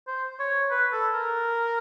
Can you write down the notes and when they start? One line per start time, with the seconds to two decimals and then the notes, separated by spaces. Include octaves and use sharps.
0.07 C5
0.40 C#5
0.71 B4
0.92 A4
1.14 A#4